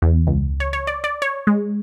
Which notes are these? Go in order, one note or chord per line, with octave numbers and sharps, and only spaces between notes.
E2
C#2
C#5
C#5
D5
D5
C#5
G#3